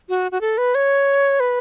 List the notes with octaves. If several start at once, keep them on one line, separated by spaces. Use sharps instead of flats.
F#4
F#4
A4
B4
C#5
B4